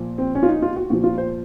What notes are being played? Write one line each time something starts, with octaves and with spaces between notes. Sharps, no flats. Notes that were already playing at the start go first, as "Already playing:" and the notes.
Already playing: A#2 F3
C4
C#4
F4
D#4
F4
F#4
A#2 F3 F#4
F4
C5